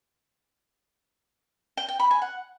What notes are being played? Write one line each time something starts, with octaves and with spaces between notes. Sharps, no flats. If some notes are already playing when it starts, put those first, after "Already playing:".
G5
G5
B5
G#5
F#5